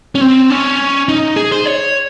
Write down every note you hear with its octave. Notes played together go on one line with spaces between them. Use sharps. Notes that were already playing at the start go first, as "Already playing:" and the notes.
C#4
C4
C#4
D#4
G#4
C5
C#5